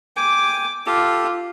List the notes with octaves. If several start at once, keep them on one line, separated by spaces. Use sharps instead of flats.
G5 G#5 D6
F4 G4 A4